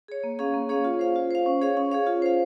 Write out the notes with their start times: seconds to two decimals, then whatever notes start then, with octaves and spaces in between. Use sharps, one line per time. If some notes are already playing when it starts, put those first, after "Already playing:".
0.08 G#4 C#5
0.23 A#3
0.39 C#4 G#4 C#5 F5
0.54 A#3
0.69 C#4 G#4 C#5 F5
0.84 F4
0.99 C5 F5
1.16 F4
1.31 C5 F5
1.46 C#4
1.62 G#4 C#5 F5
1.77 C#4
1.91 G#4 C#5 F5
2.07 F4
2.22 C5 F5